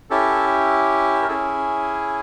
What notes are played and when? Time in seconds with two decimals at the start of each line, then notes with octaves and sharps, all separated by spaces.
0.10 C#4 E4 G4 A4
1.22 A#4
1.28 C#4 E4 G#4 A4